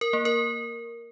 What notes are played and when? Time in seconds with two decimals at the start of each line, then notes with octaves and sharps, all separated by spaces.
0.01 A#4
0.13 A#3
0.25 A#4